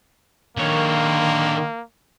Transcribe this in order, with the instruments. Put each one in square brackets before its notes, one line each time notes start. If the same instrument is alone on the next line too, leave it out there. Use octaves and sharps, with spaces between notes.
[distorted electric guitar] D3 C#5 [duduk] D#3 [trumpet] A#3